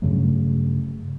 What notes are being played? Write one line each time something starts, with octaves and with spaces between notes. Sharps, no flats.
G2 C#3 F#3 A3